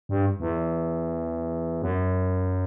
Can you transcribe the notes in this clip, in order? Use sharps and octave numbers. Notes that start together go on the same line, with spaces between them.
G2
E2
F#2